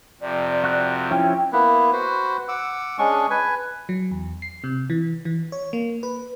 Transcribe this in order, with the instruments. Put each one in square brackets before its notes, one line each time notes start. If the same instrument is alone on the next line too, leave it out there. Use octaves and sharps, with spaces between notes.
[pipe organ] F2 C3 [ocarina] D5
[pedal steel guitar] F#4 F#6
[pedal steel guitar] F3 C#4 E4 [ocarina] G5
[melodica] A#3 B3 E4 B4
F#4 B4 C5
F#5 D6 E6
G#3 C#4 D4 C#6
B4 G#5
[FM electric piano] F#3
E2
C7
C3
E3
E3
C#5
A#3
B4